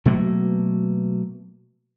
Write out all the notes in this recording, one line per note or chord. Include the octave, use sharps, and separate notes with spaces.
B2 F#3 A3 A#3